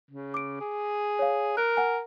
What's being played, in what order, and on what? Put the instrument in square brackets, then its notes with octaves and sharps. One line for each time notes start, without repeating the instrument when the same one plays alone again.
[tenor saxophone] C#3
[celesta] D6 D7
[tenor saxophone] G#4
[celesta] C#5 F5
[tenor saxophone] A#4 [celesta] F#6
[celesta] F#5 G#5